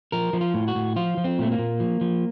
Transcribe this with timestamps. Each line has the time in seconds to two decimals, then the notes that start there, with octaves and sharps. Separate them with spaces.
0.12 F3 A#4
0.33 F3
0.41 F4
0.54 A2
0.68 F#4
0.75 A2
0.96 F3 F4
1.17 F3
1.24 C4
1.38 A#2 A3
1.52 A#3
1.59 A#2
1.80 F3
2.01 F3